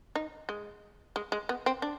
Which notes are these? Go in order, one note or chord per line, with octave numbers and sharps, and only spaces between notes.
D#4
G#3
G#3
G#3
B3
C4
D4